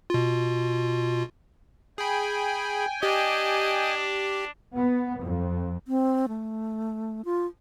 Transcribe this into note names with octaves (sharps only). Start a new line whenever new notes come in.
B2 F4
G#4 G5 G#5 B5
D4 G4 D#5
B3
F2
C4
A3
F4